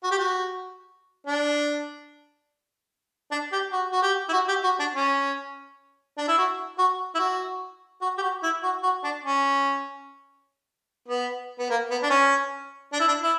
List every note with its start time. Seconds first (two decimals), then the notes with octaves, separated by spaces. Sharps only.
0.04 F#4
0.11 G4
0.18 F#4
1.26 D4
3.31 D4
3.52 G4
3.72 F#4
3.92 F#4
4.03 G4
4.29 E4
4.33 F#4
4.48 G4
4.64 F#4
4.79 D4
4.95 C#4
6.18 D4
6.28 E4
6.38 F#4
6.78 F#4
7.15 E4
7.19 F#4
8.01 F#4
8.18 G4
8.22 F#4
8.43 E4
8.63 F#4
8.83 F#4
9.04 D4
9.25 C#4
11.08 B3
11.59 B3
11.70 A#3
11.91 B3
12.03 D4
12.10 C#4
12.93 D4
13.00 E4
13.07 D4
13.23 E4